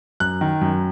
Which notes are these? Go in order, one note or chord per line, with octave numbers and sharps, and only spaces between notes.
F#2 F#6
D#3
F#2